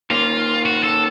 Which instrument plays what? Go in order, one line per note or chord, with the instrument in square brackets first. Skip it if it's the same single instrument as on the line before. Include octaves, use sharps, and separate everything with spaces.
[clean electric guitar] D#3 A#3 C#4 [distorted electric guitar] F4
[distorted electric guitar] F#4
A4